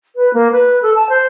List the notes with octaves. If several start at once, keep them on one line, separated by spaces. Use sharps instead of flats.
B4
A#3
B4
A4
A5
C5